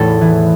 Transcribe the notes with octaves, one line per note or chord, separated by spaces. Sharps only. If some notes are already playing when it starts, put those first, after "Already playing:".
Already playing: E2 A2 A4
E3